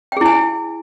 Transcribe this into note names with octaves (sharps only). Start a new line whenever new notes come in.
E4 G#4 G5 G#5